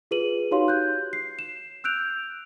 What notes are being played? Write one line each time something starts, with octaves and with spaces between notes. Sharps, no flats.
F4 G#4 B4 D#7 F#7
D#4 F#4 G4 C#5 F5 C6
F#6 G6
C7
E7
E6 F#6 G6 D7 F7